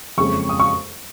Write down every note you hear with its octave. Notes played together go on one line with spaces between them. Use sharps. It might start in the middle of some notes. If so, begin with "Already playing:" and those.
F#1 F2 C#3 G#3 C#6
D#6
C#6